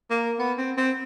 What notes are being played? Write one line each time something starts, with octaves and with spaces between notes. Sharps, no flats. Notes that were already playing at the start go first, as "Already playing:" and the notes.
A#3
B3
C4
C4